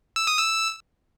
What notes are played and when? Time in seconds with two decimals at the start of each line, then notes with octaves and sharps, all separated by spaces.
0.16 E6
0.27 D#6
0.39 E6